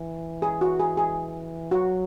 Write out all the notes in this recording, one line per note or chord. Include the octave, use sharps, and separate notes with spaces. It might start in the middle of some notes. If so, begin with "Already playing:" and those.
Already playing: E3
G#4
F#4
G#4
G#4
F#3 F#4